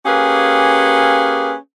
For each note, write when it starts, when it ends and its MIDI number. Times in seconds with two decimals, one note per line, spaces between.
0.06 1.53 58
0.06 1.53 61
0.06 1.53 67
0.06 1.53 68
0.06 1.53 71
0.06 1.53 77